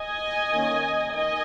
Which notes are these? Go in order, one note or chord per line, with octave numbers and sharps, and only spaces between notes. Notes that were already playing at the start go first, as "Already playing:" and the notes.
Already playing: D#5 G#5
D#3 A#3 C#4
D#3 D#5 G#5